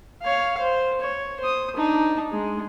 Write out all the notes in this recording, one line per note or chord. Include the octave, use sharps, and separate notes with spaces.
C#5 F5
C5
C#5
C5 D#6
D4 D#4
G#3